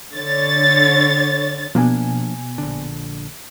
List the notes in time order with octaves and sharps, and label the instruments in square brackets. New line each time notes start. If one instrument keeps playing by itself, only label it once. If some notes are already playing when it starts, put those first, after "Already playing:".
[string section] D3 C#5 A6
[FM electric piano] B2 G#5 [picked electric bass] F3 A#3 D4
[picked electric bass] A#1 D3